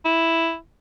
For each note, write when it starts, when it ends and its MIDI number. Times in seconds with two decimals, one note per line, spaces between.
0.05 0.55 64